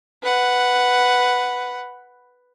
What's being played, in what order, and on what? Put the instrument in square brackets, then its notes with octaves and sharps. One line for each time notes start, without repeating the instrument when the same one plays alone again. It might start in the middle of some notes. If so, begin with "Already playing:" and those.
[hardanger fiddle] B4 F#5